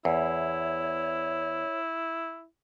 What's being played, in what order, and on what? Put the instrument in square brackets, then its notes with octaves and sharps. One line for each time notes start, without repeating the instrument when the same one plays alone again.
[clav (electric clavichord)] E2 [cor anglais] E4 [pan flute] C#5